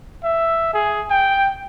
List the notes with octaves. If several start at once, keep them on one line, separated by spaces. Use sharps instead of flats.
E5
G#4
G5